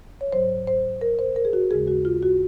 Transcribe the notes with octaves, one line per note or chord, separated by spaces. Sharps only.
C#5
G#2 F#3 C5
C5
A#4
C5
A#4
G#4
F#4
D#2 C#3 G#3 G#4
F#4
F4
F#4